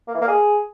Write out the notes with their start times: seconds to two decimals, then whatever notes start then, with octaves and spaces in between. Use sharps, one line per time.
0.08 A#3
0.14 E3
0.21 A#3
0.28 G#4